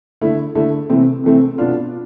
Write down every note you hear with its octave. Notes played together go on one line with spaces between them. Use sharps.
D3 A3 E4
D3 A3 E4
C3 E3 A3 C4
C3 E3 A3 C4
B2 B3 D4 F4